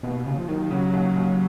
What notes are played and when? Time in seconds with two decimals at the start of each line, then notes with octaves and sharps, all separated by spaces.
0.03 D#2 B2
0.26 D#2 C#3
0.38 F3
0.48 D#3 F#3
0.71 C#3 F#3
0.93 D#2
1.15 D#2